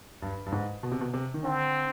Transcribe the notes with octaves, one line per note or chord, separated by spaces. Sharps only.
G2
G2
G#2
B2
C3
B2
C3
D#3
D3 C4